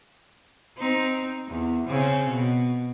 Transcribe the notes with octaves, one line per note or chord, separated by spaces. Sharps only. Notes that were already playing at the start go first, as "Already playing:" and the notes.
C4 D#4
E2
C#3 C4
B2